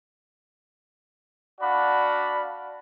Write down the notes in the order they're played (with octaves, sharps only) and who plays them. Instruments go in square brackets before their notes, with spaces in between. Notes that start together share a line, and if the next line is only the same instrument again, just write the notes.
[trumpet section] D4 F#4 D5 F5 F#5 B5